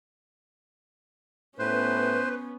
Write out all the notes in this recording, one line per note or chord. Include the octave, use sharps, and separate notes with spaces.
A2 B3 C#4 B4 C5